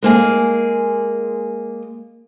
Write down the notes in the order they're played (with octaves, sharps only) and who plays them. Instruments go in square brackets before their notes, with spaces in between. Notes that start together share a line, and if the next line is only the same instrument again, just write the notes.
[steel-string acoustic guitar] G#3 A#3 G#4